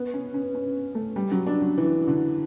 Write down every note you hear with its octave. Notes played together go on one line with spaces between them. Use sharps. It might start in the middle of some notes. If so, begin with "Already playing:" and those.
Already playing: B3
C#4
C#4
C#4
A3
G3
F#3
D4
F#3
E3
D3